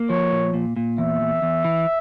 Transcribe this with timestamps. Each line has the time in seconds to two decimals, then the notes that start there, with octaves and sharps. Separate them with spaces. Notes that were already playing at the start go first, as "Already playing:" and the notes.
Already playing: A#3
0.10 F3 C#5
0.32 A#2
0.54 A#2
0.76 A#2
0.98 E2 E5
1.21 E2
1.42 E2
1.65 E3